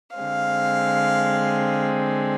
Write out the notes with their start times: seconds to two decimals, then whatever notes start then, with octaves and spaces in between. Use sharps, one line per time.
0.17 D3 G#3 C4 F5